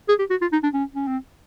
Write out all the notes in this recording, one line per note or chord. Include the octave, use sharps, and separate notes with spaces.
G#4
G4
F#4
F4
D#4
D4
C#4
C#4
C4